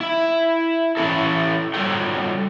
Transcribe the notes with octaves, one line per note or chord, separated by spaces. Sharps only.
E4 E5
E3 C#4 E4 A4
F#3 G3 A#3 F4 A4 G5